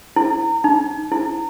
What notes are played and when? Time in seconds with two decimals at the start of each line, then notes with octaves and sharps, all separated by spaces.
0.16 E4
0.64 D#4
1.12 E4